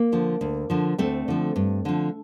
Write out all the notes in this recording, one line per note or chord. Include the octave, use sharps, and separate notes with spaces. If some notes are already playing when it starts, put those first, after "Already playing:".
Already playing: A#3
D3 F3
D2
D3 F3
D2 A3 C4
D3 F3
G2
D3 F3